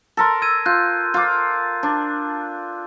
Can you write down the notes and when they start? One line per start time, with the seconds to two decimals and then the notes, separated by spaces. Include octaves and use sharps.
0.17 A4 A#4 C6
0.42 E6 G#6 D#7
0.66 F4 F#6 G6
1.14 F4 D6
1.83 D4